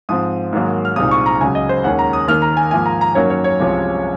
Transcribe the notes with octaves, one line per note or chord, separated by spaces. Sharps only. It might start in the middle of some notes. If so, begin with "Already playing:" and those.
G#2 F3 C4 D#6
G#2 D#3 F#3 A#3
F6
C2 A#2 G#3 C4 D#4 D#6
C#6
A#5
C#2 C#3 F#3 G#5
D#5
C5
D#2 D#3 G#3 C#4 F#5
A#5
D#6
D#2 D#3 A#3 F6
A#5
G#5
G#2 F3 A#3 G#5
A#5
A#5
F#2 D#3 F#3 A#3 C#4 C#5
C#5
C#5
C2 C3 F3 G#3 C#4